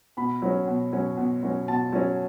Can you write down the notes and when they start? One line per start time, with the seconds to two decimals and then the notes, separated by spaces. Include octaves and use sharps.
0.17 B2 B5
0.42 F#3 C#4
0.67 B2
0.93 F#3 C#4
1.17 B2
1.43 F#3 C#4
1.68 B2 A5
1.92 F#3 C#4